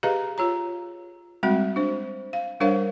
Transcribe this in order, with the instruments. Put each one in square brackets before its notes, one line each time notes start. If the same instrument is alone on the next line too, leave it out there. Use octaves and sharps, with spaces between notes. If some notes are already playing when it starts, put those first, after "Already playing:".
[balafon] G4 G#4 B4 D#5 F5 A#5
F4 C#5 A#5
G3 G#3 C4 F#4 E5
D4 C5
F5
G3 D4 A#4 C5 C#5 F5